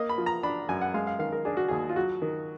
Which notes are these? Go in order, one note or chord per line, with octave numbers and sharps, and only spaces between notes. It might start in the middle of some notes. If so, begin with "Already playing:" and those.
Already playing: A#3 D#5
B5
F3
A#5
D4 B5
F#2 G#5
F#5
G#3 F5
F5
D#3 F5
A#4
D4 G#4
F#4
D#2 G#4
F4
F#3 F#4
D#3